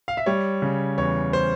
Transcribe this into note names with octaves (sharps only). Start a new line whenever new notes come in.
F5
E5
G3 C#5
C#3
E2 C#5
C5